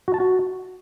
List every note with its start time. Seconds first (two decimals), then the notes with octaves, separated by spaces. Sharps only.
0.08 F#4
0.14 A5
0.20 F#4